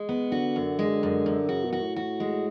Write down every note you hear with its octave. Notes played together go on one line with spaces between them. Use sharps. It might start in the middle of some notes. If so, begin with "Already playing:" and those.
Already playing: G#3
B3
D3 F#4
F#2
G#3
F#2
F#2
C#3 F#4
B2
F#4
A2
F#4
G#3